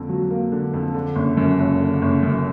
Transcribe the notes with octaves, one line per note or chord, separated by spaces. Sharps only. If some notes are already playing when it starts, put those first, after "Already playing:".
Already playing: F2 D3 A#3
F#3
A#3
D3
F2
D3
F#1
F#2
F#1
D3
F#1
F#2